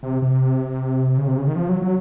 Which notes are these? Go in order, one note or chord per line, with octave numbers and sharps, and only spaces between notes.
C3
C3
C#3
C3
C#3
D#3
F3
F#3
F#3